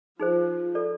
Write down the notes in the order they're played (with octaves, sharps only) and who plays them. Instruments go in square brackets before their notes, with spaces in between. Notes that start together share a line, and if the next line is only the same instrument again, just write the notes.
[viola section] F3 [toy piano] D#4 G#4 C5
[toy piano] F4 A4 D5